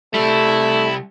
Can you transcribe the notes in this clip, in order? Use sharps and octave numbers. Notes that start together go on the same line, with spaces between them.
C2 G3 A3 E4